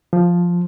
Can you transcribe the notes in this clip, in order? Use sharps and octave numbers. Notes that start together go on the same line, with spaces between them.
F3